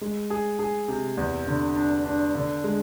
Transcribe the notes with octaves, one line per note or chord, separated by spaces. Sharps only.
G#3
G#4
G#4
C3
E2
D3
D4
D4
D3
G#3